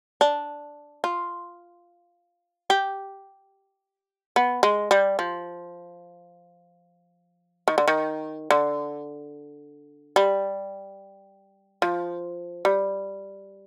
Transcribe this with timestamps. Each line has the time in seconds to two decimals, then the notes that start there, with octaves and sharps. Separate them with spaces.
0.21 D4
1.04 F4
2.70 G4
4.36 B3
4.63 G#3
4.91 G3
5.19 F3
7.68 D#3
7.78 D3
7.88 D#3
8.50 D3
10.16 G3
11.82 F3
12.65 G3